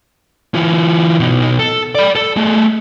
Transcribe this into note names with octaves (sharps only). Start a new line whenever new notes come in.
E3 F4
B2 D#4
A4
D5 B5
A4
A3 G#4